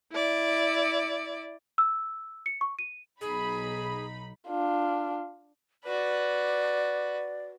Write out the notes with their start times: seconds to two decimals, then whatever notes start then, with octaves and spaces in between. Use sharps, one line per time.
0.13 E4 D5
1.78 E6
2.46 C#7
2.61 C#6
2.79 D#7
3.21 B1 D#4 G#4 B5
4.48 D4 F4
5.84 F#4 B4 D5